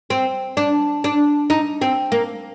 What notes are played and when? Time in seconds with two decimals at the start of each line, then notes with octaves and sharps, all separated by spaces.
0.10 C4
0.57 D4
1.04 D4
1.50 D#4
1.81 C4
2.12 A#3